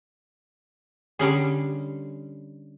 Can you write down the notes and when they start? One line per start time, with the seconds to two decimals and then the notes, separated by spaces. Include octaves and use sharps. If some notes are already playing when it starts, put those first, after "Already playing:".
1.19 D3 G3 C#4 G#4